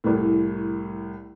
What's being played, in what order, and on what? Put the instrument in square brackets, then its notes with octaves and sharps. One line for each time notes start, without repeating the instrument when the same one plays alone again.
[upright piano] C2 A2